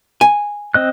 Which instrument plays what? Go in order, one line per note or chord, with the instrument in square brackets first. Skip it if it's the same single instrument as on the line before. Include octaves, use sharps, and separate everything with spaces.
[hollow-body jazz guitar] G#5
[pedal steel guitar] C4 D#5 F#6